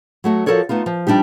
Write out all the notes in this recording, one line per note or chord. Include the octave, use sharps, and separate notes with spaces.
F#3 A3 F#4
F3 F#4 A4 A#4 C#5 D5
A3 B3 D#4 F4
F3
F3 G3 D4 D#4 G4